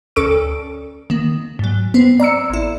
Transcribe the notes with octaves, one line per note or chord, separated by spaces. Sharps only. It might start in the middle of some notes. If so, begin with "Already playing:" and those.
D2 C#4 A4 C#6 E6 D7
D#3 A#3
G#2 F#3
B3 C4
D5 A#5 E6 C#7
A1 E4